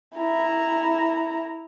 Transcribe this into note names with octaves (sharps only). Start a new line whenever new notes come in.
E4 A#5